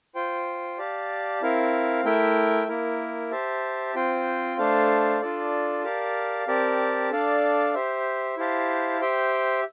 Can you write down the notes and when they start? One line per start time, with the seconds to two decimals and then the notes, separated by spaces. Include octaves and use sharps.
0.15 F4 C5 G5
0.78 G4 D5 F5 A5
1.42 C4 E4 A#4 F5
2.04 A3 E4 A#4 E5 G5
2.68 A#3 E4 A#4
3.31 G4 C5 E5 A5
3.95 C4 F4 C5 G5
4.58 A3 D4 A4 C5 F5
5.21 D4 F4 A4 D5
5.84 G4 A#4 D5 F5 A5
6.47 C4 G4 A#4 D5 A5
7.11 D4 A4 D5 F5
7.74 G4 C5 E5
8.37 E4 G4 C5 F5 A5
9.01 G4 C5 E5 G5